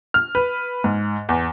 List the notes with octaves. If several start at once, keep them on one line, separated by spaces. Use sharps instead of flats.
F6
B4
G#2
E2